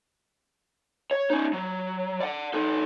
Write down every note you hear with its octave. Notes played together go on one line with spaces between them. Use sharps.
C#5
C#4 D#4
F#3
D5 F#5
D#4 A4